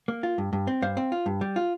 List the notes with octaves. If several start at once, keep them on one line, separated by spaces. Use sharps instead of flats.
A#3
F4
G2
G2
C4
G2 C5 F5
C4
F4
G2
G3
F4